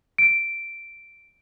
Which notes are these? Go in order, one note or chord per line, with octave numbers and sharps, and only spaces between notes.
D7